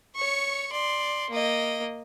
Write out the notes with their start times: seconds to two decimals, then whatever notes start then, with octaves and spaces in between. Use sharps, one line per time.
0.16 C#5 C#6
0.72 D5 C6
1.30 A#3 D#5